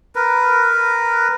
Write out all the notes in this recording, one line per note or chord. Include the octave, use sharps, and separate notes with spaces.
A#4 B4